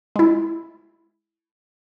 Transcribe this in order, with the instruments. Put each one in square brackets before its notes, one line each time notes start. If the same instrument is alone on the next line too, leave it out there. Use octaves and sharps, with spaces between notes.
[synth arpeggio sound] G#3 E4